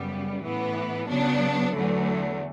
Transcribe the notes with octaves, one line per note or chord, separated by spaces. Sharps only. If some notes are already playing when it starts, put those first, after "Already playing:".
Already playing: F#2 C#3 G3 B3
A2 E3 B3
C#3 F#3 B3 D4
E2 D3 F#3 A3